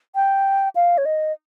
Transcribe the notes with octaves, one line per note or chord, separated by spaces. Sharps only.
G5
F5
C#5
D#5